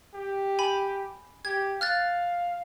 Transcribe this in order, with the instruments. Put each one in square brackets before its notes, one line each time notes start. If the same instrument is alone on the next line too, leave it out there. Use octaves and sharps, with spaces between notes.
[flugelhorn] G4
[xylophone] G#5 B5
[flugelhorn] G4 [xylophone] G#6
[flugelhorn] F5 [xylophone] F6 F#6 A6